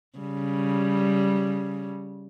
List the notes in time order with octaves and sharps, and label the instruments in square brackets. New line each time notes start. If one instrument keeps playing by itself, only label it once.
[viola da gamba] C#3 G3